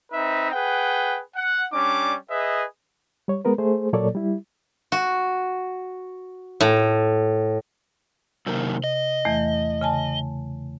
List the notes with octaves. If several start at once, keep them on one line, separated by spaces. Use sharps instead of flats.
C4 D#4 B4 E5
G#4 B4 F#5 G5
F#5
G3 C#4 D4 D6
G#4 B4 D#5 E5
G3 C#5
G#3 B3 A#4 B4
A3 G#4 C5
A#2 F#3 A#3 A4 C#5 D5
G3 E4
F#4
A2
F#2 C3 D#3 A#3
D#5
E2 E3 A3
C#3 G#5 A5